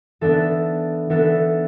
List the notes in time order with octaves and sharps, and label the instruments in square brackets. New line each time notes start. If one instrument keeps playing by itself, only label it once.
[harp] E3 B3 D4 A4
E3 B3 D4 A4